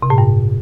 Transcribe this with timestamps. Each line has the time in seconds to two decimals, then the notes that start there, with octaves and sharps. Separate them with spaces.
0.03 C3
0.10 A2
0.18 G2